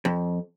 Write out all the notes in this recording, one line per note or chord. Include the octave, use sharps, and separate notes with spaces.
F2